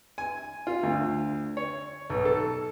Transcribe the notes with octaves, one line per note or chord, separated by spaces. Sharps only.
G#5
F4
D2
C#5
B1
A4